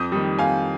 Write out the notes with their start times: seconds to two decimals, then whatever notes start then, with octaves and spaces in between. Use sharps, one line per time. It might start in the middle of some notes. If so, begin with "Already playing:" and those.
Already playing: F2 D#6 G6
0.12 D#3 G3
0.39 F2 F5 G#5